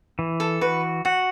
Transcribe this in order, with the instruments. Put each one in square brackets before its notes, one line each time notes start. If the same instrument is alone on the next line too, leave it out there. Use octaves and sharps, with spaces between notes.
[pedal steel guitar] E3
[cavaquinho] A4
[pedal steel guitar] F#4 [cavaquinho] B4
[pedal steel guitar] F#4 [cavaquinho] F#5